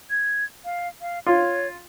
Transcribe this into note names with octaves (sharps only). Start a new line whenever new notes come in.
G#6
F5
F5
F4 C#5